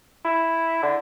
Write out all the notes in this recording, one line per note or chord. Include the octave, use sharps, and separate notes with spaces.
E4
D3